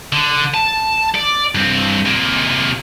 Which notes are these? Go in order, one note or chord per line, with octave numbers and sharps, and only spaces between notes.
D3
A5
D5
G2 C4
C3 A#3